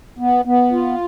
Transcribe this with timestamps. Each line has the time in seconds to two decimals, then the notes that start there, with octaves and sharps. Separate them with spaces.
0.18 B3
0.45 B3
0.72 F4